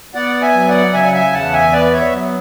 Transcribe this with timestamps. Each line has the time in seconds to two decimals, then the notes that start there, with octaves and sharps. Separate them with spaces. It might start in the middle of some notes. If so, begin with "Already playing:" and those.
0.14 B3 D5 F#5
0.42 E5 G#5
0.54 F#3
0.68 D5 F#5
0.93 C#3 E5 G#5
1.05 F#5
1.14 E5 G#5
1.33 E2 F#5 A5
1.53 E5 G#5
1.72 B3 B4 D5
1.92 C#5 E5
2.12 F#3